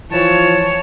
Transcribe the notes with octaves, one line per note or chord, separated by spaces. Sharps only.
E3 F3 C#5 A5